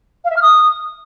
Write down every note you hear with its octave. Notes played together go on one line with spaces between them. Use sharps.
F5
E5
F6
D#6